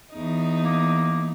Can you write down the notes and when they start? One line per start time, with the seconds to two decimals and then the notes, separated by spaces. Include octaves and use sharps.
0.14 E2 D#4
0.63 A#3